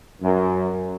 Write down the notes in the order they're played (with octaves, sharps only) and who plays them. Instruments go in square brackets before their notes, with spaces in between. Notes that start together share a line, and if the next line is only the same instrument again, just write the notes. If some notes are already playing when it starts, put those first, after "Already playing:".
[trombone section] F#2